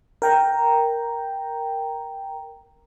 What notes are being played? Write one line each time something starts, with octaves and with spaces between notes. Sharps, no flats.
A#4 G5 A#5